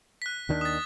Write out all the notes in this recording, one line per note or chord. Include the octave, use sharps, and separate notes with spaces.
F#6 B6
D#2 D#3 D4
D#6 A6